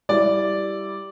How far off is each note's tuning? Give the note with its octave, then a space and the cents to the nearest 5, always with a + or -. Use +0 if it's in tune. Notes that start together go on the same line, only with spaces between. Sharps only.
G3 +0 E4 +0 D5 -5